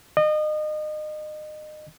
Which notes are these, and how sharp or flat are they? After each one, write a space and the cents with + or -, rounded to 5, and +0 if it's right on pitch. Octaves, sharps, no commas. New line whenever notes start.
D#5 -30